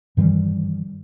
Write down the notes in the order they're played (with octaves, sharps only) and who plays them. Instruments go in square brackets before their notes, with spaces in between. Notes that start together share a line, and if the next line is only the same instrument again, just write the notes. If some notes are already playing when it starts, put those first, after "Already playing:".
[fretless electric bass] G2 D#3 E3 G3